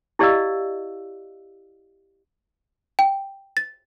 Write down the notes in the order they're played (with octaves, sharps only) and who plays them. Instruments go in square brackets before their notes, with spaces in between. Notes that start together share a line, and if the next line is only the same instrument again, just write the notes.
[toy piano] E4 G4 D5 D#5 F5 E6
[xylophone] G5
A6